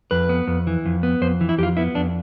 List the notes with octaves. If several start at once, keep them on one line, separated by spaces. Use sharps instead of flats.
F2 B4
B3
F2
E3
F2
B3
F2 C5
E3
E4
F2 F4 G4
B3 E4
F2 D4